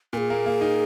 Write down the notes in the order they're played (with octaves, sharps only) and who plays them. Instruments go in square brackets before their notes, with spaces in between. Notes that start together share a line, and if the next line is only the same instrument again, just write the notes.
[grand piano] A#2 [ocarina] A#4
[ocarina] G#4
[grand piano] A#3
A#3
D#4